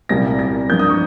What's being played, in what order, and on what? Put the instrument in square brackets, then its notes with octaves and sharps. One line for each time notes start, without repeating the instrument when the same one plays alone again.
[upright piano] C2 A#2 G3 A#3 A#6
A#6
G2 F3 A#3 G6
D#6
C#6